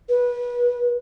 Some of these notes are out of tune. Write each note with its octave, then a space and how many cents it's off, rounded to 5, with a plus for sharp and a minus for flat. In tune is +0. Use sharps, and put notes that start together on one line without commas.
B4 -25